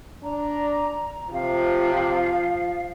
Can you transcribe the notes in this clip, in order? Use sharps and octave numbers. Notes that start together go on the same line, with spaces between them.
D4 A#5
C3 F3 F5